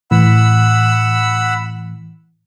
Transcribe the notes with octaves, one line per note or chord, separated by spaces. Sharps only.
A2 E3 F#5 B5 E6